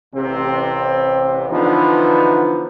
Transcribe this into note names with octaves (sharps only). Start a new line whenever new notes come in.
A1 C3 C4
D3 E3 F3 B3 D4 D#4